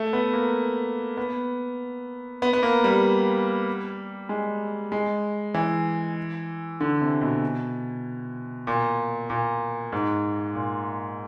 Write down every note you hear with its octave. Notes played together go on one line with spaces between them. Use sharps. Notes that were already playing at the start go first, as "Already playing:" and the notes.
Already playing: A3
B3
A#3
B3
B3
B3
A#3
G3
G#3
G#3
E3
D3
C3
B2
A#2
A#2
G#2
A#2